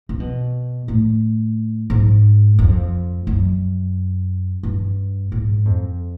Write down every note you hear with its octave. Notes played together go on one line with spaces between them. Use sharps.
C3
B2
A2
G#2
F2
F#2
G2
G#2
F2